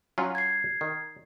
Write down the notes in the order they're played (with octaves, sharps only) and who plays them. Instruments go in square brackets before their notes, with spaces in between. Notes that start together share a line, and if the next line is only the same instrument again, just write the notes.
[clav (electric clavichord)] F#3 C#4 F4
[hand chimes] G#6 C7
[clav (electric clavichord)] D#3